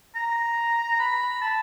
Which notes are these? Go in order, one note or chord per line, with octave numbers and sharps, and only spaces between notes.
A#5
B5
A5